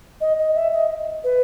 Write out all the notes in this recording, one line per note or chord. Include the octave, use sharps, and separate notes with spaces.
D#5
D#5
E5
D#5
B4